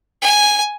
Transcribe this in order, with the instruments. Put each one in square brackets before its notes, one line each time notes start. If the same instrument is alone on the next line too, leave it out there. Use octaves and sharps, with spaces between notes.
[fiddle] G#5